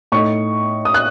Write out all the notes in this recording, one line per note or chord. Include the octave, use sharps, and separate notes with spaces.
A2 A3 D#4 C#6
D#6
F#6